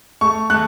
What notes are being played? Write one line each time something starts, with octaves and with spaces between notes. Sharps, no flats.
A3 C#6
A3 F#6